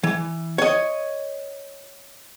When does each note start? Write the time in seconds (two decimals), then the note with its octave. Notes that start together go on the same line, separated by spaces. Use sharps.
0.03 E3
0.58 C#5 D#5